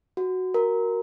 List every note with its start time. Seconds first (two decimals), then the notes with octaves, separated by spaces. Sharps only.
0.17 F#4
0.54 A#4